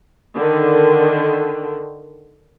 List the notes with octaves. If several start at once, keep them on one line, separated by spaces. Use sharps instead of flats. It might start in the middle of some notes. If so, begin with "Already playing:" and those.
D3 D#3